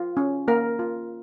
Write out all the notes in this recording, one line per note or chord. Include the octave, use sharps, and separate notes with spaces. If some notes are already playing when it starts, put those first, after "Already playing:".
Already playing: F4
C#4
A#3 A#4
F4